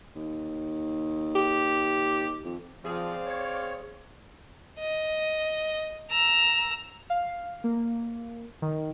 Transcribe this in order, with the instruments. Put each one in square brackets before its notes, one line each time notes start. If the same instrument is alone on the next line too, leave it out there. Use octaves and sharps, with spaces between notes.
[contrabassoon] D#2
[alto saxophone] G4
[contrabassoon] F2
[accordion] F3 [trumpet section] C4 D5 F5 [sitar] G#4
[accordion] C#5
[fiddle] D#5
A#5 E6
[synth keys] F5
A#3
D#3